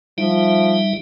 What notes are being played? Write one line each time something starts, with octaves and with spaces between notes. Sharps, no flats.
F3 G3 D#4 E5